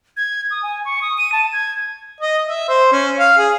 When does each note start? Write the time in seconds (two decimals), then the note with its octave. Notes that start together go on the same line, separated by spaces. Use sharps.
0.17 G#6
0.51 D#6
0.63 G#5
0.85 C#6
1.02 D#6
1.18 D#7
1.32 A5
1.53 G#6
2.21 D#5
2.49 E5
2.69 C5
2.92 C#4
3.19 F5
3.38 G#4